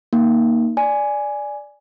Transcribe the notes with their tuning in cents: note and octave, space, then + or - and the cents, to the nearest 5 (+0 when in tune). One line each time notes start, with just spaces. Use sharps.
A#3 +0 D#4 +0
D5 +0 G#5 +0